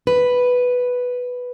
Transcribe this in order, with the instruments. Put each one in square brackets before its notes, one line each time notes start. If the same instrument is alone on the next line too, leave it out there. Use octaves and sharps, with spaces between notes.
[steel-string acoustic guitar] B4